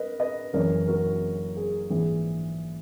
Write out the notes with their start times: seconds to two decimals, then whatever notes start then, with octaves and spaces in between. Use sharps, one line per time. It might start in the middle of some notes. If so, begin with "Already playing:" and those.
Already playing: A#4 B4 D#5
0.20 B4 D#5
0.53 F#1 F#2 E3 A#4 C#5
0.88 F#4 A#4
1.57 G#4
1.90 A#1 G#2 E3 G#4